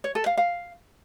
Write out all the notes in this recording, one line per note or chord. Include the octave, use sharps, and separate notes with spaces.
C#5
A4
F5
F5